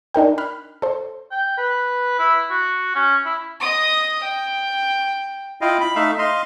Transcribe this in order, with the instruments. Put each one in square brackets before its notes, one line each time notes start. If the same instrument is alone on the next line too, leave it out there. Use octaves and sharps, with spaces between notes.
[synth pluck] D4 D#4 A#4 G5
B5 F6 F#6
A4 C5
[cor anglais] G5
B4
E4
F#4
C#4
E4
[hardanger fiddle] D#5 D#6
G5
[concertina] E4 F4 D#5 F5 G5
B5
A3 D#4 E5 F5
D#5 F5 C6